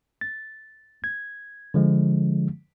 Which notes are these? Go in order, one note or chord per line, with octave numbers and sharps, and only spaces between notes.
A6
G#6
D3 F3 G#3